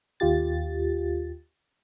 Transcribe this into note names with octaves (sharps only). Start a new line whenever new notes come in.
D#2 F4 G4 A6